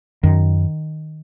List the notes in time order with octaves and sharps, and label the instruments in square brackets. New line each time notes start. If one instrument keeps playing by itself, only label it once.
[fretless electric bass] F#2 D#3